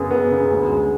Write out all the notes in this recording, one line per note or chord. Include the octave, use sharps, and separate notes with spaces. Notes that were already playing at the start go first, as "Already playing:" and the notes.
Already playing: F#2 C#3 B3 G#4
B3
C#3
D2
G#3